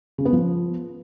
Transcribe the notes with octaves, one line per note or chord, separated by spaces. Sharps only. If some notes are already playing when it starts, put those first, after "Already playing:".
C#3
B3
F3